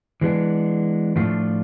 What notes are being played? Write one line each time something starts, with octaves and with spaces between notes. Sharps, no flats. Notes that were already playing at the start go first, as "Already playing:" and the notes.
E3 G#3 B3 D4
A2 F3 A3 D4 F4